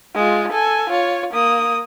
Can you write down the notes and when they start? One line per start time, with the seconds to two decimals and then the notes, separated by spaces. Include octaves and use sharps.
0.15 G#3 F4
0.52 A4 G#5
0.89 F4 C#5
1.33 A#3 D#6